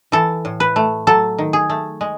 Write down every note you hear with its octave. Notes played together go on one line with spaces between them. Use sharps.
E3 A4
A2
B4
A3
F#3 A4
D#3
G#4
A3
G#3